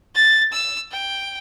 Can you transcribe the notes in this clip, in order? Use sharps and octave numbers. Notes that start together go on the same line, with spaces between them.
A6
E6
G5